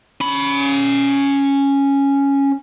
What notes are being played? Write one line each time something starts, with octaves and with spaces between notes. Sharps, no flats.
C#4 B5